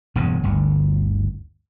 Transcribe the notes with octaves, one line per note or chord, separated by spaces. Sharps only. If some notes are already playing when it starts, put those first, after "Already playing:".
E1 E2 G2 C#3
G1 D2